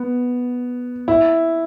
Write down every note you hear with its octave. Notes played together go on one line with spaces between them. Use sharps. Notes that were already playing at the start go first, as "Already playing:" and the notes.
Already playing: B3
E4